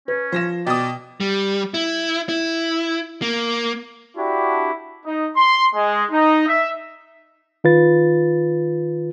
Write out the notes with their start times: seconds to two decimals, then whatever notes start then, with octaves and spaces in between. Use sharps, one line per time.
0.08 C#4 B4
0.32 F3 C5 A#6 E7
0.67 B2 D5 G5 D#6
1.20 G3
1.74 E4
2.29 E4
3.22 A#3
4.17 D4 E4 F#4 G4
5.05 D#4
5.36 C6
5.75 G#3
6.11 D#4
6.47 E5
7.64 D#3 F4 B4 A6